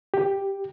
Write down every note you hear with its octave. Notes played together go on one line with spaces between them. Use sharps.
G4